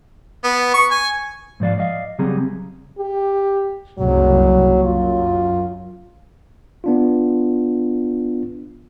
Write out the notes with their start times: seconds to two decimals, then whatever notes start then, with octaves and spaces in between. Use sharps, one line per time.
0.44 B3
0.74 C#6
0.91 G#5
1.60 G#2 F3 D5 F5
1.78 D5 D#5 F5
2.19 C#3 F#3 G3 C4 G#4 A#5
2.98 G4
3.99 F#1 C2 F#2 F#3
4.84 F#2 F4
6.84 B3 D4 F4